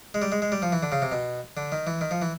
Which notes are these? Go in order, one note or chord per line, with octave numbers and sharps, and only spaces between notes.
G#3
G3
G#3
G#3
G3
F3
E3
D3
C#3
C3
B2
D3
D#3
E3
D#3
F3
E3